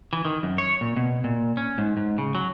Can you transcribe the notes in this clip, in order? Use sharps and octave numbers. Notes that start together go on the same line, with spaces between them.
E3
D#3
F#2
C#5
A#2
B2
A#2
C#4
G#2
G#2
C#3
F#3